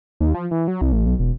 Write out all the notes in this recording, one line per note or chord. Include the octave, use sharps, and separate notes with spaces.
D#2
F3
E3
F#3
C2
A1
B1
E1